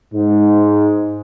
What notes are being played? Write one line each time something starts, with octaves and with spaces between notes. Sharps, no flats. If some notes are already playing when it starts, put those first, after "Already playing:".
G#2